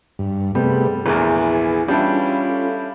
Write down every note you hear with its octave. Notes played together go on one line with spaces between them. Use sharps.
G2
C3 G3 A3 B3 G#4
A#1 E2 B3 E4 G#4
E3 G3 C#4 D4 E4 F4
A4